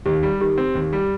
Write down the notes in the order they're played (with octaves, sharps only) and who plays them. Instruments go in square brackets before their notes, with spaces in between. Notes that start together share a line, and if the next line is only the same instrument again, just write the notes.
[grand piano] D#2 [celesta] G4
[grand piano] G3
[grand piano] D#3 [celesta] G4
[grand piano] C4
D#2
G3